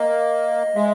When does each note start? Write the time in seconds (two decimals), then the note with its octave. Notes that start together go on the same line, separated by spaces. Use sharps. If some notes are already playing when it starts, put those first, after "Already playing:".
Already playing: A#3 D#5
0.76 G#3 E5